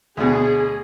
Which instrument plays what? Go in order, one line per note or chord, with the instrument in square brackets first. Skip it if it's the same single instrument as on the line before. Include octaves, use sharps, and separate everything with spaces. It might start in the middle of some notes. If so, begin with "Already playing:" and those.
[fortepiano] D2 B2 [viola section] G#4